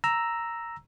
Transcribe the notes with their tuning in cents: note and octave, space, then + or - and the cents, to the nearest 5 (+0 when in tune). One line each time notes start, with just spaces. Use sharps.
A#5 +0 E6 +0